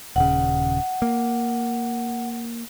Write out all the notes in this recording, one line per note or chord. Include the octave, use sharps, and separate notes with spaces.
D#1 C#3 F#5
A#3